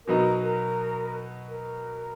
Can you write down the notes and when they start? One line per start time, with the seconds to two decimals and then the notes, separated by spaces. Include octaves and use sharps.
0.06 B2 F#3 B3 D#4 A#4
0.42 A#4
1.48 A#4